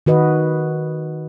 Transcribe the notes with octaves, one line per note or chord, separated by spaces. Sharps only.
D#3 F#4 B4 D#5